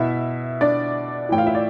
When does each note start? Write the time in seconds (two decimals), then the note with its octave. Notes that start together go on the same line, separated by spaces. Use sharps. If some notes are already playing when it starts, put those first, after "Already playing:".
Already playing: B2 E4 E5
0.61 D4 D5
1.29 A2 E3 G5
1.38 F4 F5
1.47 E4 E5
1.55 D5